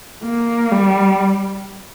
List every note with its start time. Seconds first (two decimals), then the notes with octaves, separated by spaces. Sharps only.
0.24 A#3
0.72 G3